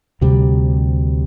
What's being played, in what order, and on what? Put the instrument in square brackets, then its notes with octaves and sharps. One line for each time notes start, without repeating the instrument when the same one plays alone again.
[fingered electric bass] D2 C3 G3